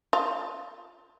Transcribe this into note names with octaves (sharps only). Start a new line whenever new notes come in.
F4